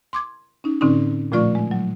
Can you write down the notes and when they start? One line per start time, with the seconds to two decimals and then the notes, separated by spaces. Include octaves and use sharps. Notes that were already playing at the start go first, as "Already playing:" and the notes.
0.13 C6 D6 G#6
0.64 C#4 D#4
0.81 A2 D3 C4 C#4 D#4
1.32 A#2 F3 A3 F4 D5 C#6
1.55 G#3
1.71 F#3